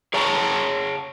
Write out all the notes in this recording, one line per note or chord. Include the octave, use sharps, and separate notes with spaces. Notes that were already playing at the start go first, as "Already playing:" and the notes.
G#4 C#5 G5 A5 A#5